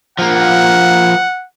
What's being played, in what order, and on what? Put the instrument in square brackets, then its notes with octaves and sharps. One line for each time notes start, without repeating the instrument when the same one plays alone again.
[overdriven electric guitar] F3 A#3 [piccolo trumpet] F#5